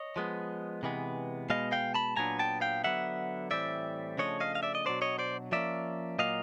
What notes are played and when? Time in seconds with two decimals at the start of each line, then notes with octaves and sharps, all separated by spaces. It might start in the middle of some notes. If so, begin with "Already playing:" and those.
Already playing: C#5 D#5
0.16 F3 G#3 B3
0.83 C3 E3 G#3 B3
1.50 B2 G#3 B3 D#5 F5
1.72 F5 G5
1.94 A5 B5
2.16 A#2 F#3 B3 D4 G#5 A#5
2.39 G5 A5
2.61 F5 G5
2.84 D3 F#3 B3 E5 F#5
3.51 A2 E3 G3 C4 D5 E5
4.18 C#3 F3 A3 D4 C#5 D#5
4.40 D#5 F5
4.55 F5
4.63 D5 E5
4.75 D#5
4.85 B2 F#3 A#3 D4 C5 D5
5.02 C#5 D#5
5.19 C5 D5
5.52 F3 A#3 C#4 D5 E5
6.19 A#2 F#3 A#3 D#5 F5